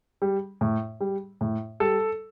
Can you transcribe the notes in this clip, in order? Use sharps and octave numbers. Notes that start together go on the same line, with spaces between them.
G3
A2
G3
A2
G3 A4